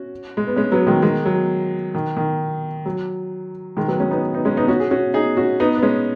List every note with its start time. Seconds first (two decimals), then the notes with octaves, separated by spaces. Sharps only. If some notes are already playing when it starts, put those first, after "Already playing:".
Already playing: C#4 F#4
0.37 G#3
0.47 B3
0.56 G#3 C#4
0.72 F#3 B3
0.87 D#3 G#3
1.02 D#3 G#3
1.25 F#3
1.94 D#3
2.17 D#3
2.86 F#3
3.77 D#3 G#3
3.88 F#3 B3
4.00 G#3 C#4
4.11 B3 D#4
4.34 B3 D#4
4.45 G#3 C#4
4.57 B3 D#4
4.68 C#4 F#4
4.80 G#4
4.91 C#4 F#4
5.14 D#4 G#4
5.37 C#4 F#4
5.60 B3 D#4
5.77 B3
5.82 G#3 C#4